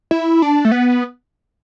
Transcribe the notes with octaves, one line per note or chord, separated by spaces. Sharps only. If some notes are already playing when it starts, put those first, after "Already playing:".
E4
D4
A3
B3